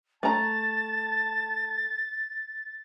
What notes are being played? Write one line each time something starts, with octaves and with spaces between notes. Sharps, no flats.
A3 A5 A#5 A6